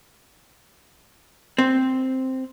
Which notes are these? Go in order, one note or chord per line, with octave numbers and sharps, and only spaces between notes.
C4